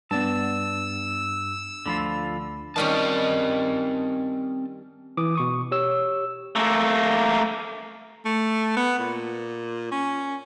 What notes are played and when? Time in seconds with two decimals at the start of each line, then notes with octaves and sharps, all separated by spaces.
0.11 G2 B3 D5 A5 E6
1.86 D2 D3 F3 F4 B5
2.76 D#3 G3 C4 C#4 D#5 A5
5.17 E3 D6 D#6
5.35 B2 C#6 D#6
5.71 G4 C#5 E6
6.56 A3 A#3
8.25 A3
8.77 B3
8.99 A#2
9.91 C#4